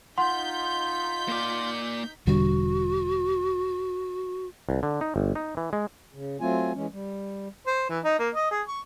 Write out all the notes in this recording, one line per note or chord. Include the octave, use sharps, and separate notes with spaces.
D#4 F4 F#5 C6 G6 B6
A#3 D5
E1 D3 G3 F#4
C2
D3
D#4
G1
D#4
E3
G#3
C#3
F#3 A3 C4 F4 G#5
E3 G#3 C#4
G3
C5
E3
D#4
A#3
D#5
G#4
C#6